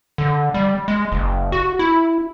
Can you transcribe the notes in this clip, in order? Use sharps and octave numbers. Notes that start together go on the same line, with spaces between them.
D3
G3
G#3
F#1
F#4
E4